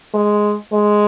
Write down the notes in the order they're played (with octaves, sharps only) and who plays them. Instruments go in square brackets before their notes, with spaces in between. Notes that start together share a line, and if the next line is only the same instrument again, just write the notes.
[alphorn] G#3
G#3